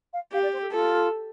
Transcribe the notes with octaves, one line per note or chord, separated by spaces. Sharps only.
F5
G4 F5
D5
C5
A4
F4 A4